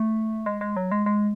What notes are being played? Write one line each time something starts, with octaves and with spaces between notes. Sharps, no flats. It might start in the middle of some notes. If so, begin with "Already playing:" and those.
Already playing: A3
G#3
G#3
F#3
G#3
G#3